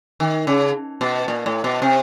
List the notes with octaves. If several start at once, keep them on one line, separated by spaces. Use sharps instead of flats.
D#3
C#3
B2
A#2
A2
B2
C3